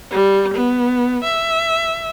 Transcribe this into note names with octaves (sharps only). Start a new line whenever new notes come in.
G3
B3
E5